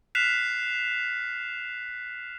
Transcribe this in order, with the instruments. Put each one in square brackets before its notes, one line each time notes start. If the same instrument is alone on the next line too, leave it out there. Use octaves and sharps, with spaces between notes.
[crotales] F6 F#6 B6 C7 E7 F7